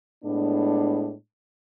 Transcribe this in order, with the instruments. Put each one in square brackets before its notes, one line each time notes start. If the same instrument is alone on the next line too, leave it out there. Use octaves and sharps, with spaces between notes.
[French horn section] A2 G#3 B3 D4